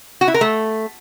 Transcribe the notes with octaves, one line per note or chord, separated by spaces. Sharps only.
F#4
E4
A#4
A3